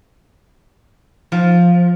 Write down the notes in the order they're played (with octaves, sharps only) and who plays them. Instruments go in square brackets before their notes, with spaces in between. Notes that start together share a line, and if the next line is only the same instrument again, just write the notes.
[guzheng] F3